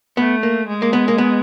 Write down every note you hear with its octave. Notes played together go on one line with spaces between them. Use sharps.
A3 B3
A#3
G#3
A#3
B3
A#3
B3